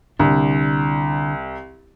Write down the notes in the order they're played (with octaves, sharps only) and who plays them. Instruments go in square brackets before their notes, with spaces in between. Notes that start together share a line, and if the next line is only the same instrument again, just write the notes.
[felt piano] C2 [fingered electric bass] D3 D4